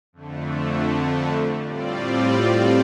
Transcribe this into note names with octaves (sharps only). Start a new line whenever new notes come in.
F2 D3 A3
A2 G3 C4 F4 D5